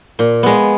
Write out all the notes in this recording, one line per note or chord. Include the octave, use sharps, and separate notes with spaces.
A#2
G#3 B3